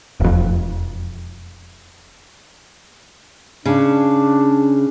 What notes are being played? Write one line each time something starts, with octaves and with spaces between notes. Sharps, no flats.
E1 F2
C#3 D4